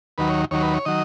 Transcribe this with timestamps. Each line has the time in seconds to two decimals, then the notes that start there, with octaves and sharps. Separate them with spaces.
0.18 D#2 D#3 F#3 B4
0.29 C#5
0.51 D#2 D#3 F#3 C#5
0.62 B4
0.74 C#5
0.85 D#3 F#3 D#5